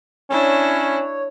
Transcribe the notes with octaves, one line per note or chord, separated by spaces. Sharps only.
C#4 D4 E4 C#5